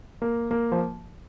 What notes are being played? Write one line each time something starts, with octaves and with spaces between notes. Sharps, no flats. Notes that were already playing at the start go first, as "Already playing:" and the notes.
A#3
A#3
F3